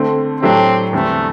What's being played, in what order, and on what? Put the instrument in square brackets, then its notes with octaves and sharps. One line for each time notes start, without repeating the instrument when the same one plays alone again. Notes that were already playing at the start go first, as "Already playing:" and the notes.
Already playing: [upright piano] D3 A3 C4
[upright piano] A2 F#3 A3 D4 G4 [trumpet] C4
[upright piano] E2 D3 G3 C4 [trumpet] A3